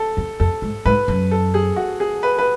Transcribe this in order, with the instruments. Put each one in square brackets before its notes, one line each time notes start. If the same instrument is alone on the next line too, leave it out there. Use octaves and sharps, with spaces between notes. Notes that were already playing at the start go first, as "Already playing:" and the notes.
Already playing: [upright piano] A4
[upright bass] F2
[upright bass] F2 [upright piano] A4
[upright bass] G#2
[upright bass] G#2 [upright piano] B4
[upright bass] F#2
[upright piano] A4
G#4
F#4
G#4
B4
B4